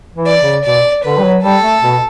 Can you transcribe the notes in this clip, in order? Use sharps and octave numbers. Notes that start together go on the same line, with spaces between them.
E3
D5
C#3
B2 D5
D3 B4
G3
F#3
G3 A4
A3
B2